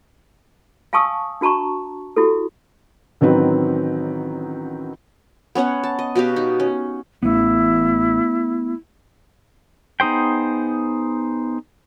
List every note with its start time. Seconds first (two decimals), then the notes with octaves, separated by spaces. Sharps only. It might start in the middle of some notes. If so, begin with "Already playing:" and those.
0.93 F5 G#5 A5 C#6 D#6 E6
1.41 D4 F#4 A5 A#5 C#6
2.16 E4 F#4 G4 A4
3.21 A1 D#3 F#3 C4 B4
5.55 B3 C#4 C#5 F#5
5.83 A5
5.99 D#5
6.15 B2 F#4 G4 F5
6.36 D#4
6.60 C#4
7.23 A1 A3 B3 E4
10.00 B3 D#4 G#4 C5 G5